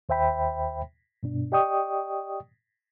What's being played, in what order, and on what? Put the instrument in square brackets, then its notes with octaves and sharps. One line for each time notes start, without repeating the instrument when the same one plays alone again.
[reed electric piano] D#2 C5 E5 G5 B5
G2 B2 D4
G4 D5 D#5 G5 C#6 D#6